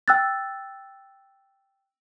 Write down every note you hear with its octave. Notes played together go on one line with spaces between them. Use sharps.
G5 E6 F#6 A6